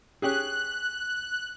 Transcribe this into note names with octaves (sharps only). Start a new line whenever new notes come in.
C#4 G4 G#4 F#6